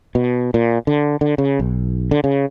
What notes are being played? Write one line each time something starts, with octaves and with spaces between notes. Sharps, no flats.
B2
A#2
D3
D3
C#3
B1
D3
C#3